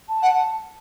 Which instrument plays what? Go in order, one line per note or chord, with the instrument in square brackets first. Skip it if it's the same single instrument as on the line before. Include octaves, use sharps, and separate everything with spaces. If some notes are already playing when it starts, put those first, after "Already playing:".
[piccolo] A5
[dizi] F#5